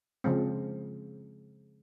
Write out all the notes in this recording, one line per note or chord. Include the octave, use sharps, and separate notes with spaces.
C#3 F3 G#3 C4